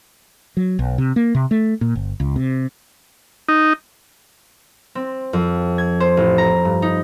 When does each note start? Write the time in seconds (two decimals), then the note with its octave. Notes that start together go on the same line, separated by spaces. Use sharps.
0.57 F#3
0.79 B1
0.98 C3
1.16 A#3
1.35 C3
1.51 A3
1.81 A#2
1.95 G1
2.20 C#2
2.36 C3
3.48 D#4
4.95 C4
5.33 F2
5.78 G#6
6.00 C5
6.17 A1
6.38 A#5
6.65 G2
6.82 D#4